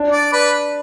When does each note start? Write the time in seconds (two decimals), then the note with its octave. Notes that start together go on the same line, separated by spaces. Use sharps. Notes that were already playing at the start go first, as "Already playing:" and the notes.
Already playing: D4
0.12 D5
0.33 B4